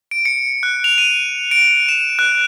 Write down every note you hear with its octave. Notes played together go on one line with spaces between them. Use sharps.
D7
C#7
F#6
F7
D#7
D7
E7
F#6